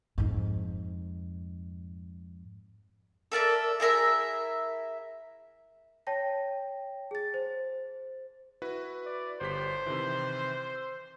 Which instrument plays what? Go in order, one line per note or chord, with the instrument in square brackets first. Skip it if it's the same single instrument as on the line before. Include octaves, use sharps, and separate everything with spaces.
[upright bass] F2 G#2
[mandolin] A4 A#4 D5 E5
E4 G#4 A#4 E5
[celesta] C#5 G5 A5 A#6
G#4 A6
C5
[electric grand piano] E4 F#4 B4
[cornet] D5
[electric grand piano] G1 G4 B6 [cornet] C5
[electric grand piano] C3 D#3 E3
E6